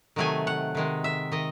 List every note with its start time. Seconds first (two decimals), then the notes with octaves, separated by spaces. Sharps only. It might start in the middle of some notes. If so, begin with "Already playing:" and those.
0.16 C3 D#3 F#3 A3 G#5
0.47 F#5
0.75 C3 D#3 G#3
1.04 E5
1.32 D#3 D#5